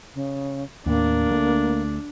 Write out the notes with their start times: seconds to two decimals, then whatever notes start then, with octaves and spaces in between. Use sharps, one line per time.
0.14 C#3
0.86 D#2 A2 A#3 D4
1.29 D2 G#3 A3